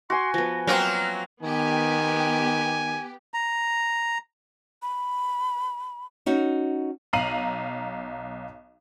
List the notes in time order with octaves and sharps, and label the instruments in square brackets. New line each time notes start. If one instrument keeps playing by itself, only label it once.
[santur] F#4 G#5 [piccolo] C6
[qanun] F3 B3 [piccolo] A#6
[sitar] F#3 A#3 C4 [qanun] D#5 [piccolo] F6
[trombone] D#3 [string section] B3 G4 [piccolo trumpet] G#5
[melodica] A#5
[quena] B5
[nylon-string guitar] C#4 D#4 F#4
[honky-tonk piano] B1 F5 A#5 C7 D#7 F#7